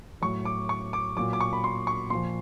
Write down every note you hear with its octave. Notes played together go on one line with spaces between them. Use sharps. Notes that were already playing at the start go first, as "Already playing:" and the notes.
A2 F#3 C#6
D6
C#6
D6
A#2 F#3 D6
D6
C#6
B5
C6
C#6
A#2 F3 C6